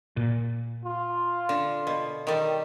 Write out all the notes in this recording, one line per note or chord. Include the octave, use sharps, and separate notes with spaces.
A#2
F4
D3
B2
D#3 G3